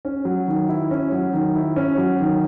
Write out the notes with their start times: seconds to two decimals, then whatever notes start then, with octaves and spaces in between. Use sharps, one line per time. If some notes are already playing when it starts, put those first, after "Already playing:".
0.05 C#4
0.25 F#3
0.48 D#3
0.69 E4
0.91 C#4
1.12 F#3
1.33 D#3
1.55 E4
1.76 C#4
1.98 F#3
2.20 D#3